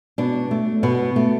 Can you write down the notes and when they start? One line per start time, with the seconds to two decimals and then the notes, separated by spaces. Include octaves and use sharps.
0.18 B2 D4
0.51 A3
0.83 B2 B3
1.16 A3